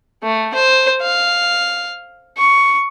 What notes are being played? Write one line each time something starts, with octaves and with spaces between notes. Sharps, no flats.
A3
C5
F5
C#6